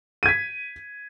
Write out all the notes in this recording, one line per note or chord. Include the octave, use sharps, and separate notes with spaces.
G#6 B6 D#7